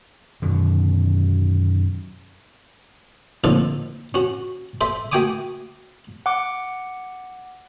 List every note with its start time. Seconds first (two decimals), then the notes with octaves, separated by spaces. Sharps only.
0.42 F#2 B2 D3 D#3
3.44 A#1 F2 A2 D3 D#4 A4
4.14 C#4 F#4
4.81 A4 C5 E5
5.12 A3 F#4 G5 G#5 D6 D#6
6.26 F#5 D6